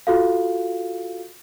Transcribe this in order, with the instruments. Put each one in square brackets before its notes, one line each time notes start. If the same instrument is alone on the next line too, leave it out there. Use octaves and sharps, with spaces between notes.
[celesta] F4 F#4 A4 F5